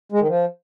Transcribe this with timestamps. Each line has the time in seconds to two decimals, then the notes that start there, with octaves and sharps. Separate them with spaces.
0.12 G#3
0.20 D#3
0.28 F3